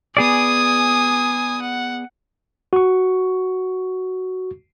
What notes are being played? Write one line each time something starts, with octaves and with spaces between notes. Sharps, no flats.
B3 G#4 D5 G#5 D#6
F#5
F#4 C#6